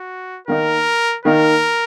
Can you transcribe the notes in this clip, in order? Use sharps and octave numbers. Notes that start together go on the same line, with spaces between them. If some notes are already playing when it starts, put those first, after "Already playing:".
Already playing: F#4
D#3 A#3 D#4 A#4
D#3 A#3 D#4 A#4